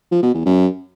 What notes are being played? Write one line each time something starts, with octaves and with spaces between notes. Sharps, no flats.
F3
B2
E2
F#2